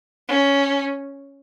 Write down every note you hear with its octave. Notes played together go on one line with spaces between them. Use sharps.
C#4